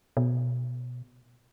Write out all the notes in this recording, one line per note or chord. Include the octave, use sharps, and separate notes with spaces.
B2